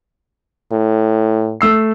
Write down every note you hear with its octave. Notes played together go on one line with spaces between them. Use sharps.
A2
A3 E6 C7